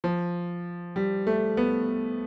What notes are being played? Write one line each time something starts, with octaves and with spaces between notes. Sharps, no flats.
F3
G3
A3
B3